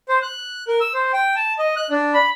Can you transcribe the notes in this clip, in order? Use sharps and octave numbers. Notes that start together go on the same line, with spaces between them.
C5
F#6
A#4
E6
C5
G5
A5
D#5
F#6
D4
B5